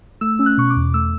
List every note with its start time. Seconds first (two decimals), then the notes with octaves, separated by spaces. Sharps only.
0.21 A3 E6
0.39 C#4
0.46 F#6
0.58 B2 C#6
0.70 D6
0.76 E2
0.94 A3 E6